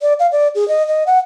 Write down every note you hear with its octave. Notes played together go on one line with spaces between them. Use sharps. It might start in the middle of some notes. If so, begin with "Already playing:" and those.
D5
F5
D5
G#4
D#5
D#5
F#5